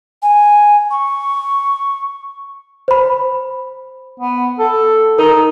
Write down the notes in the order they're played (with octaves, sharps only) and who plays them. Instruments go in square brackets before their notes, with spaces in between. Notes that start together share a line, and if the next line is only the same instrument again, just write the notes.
[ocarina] G#5
C#6
[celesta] C5 B5
[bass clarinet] B3
A4
[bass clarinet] D#4 [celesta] A#4